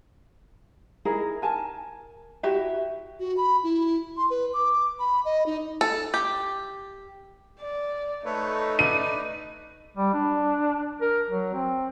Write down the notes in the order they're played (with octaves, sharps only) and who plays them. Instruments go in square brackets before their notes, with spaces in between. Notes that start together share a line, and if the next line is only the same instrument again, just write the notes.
[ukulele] D#4 E4 G#4 A#4
A#4 G#5 A5
E4 F#4 G4 E5
[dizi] F#4
B5
E4
C6
B4
D6
B5
D#5
D#4
[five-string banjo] A4
G4
[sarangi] D5
[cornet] A3 [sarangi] D#4 [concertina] A4 B4 C#5
[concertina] B4 D5 [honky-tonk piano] D#7
[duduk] G3
D4
A#4
F#3
C4